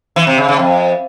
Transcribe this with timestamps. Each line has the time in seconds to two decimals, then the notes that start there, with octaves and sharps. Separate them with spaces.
0.16 E3
0.27 C3
0.38 C#3
0.48 C#3
0.59 F2